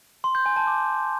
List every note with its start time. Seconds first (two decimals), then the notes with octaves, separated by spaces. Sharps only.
0.24 C6
0.35 G6
0.46 G#5
0.56 A5
0.67 D6